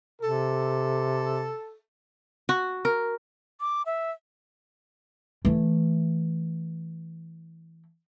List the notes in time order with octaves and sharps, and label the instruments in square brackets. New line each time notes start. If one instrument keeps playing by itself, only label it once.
[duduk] C3 [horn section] A4
[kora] F#4
A#4
[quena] D6
E5
[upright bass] E3 A3